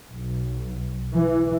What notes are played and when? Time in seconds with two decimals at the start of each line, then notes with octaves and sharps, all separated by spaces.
0.12 B1
1.16 E3